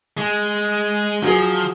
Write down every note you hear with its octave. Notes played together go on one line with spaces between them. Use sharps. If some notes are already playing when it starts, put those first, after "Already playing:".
G#3
F3 F#3 G#4